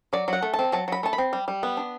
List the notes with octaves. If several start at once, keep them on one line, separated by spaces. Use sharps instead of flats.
F#3 D5
F#3 F#5
A3
A5
C4
F#3 A5
F#3 B5
A3 A5
B5
C4
G3
G3
B3
D4